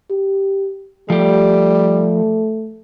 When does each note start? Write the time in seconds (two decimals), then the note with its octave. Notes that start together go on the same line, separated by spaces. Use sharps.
0.10 G4
1.10 F3 G3 A3 G4